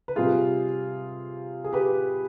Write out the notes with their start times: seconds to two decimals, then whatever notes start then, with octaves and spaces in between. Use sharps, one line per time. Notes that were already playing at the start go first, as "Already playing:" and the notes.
0.08 B4
0.16 C3 G3 F4 G#4
1.64 G#4
1.73 G4 B4